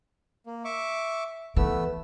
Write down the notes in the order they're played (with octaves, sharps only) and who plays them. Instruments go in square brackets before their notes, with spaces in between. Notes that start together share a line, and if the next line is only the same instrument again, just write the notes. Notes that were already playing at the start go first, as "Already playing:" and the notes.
[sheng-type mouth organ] A#3
E5 C#6 D6
[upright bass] E3 [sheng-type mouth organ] A3 B3 E6